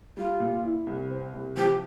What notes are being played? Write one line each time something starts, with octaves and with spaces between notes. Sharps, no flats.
G3 F4
A#2
E4
C2
C4
C2
F3 G4